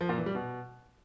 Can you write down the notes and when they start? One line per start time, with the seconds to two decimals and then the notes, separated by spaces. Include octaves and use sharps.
0.01 F3
0.09 A#2
0.18 E3
0.26 G3
0.35 B2